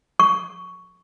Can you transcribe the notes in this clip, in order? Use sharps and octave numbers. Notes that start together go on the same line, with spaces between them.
C#6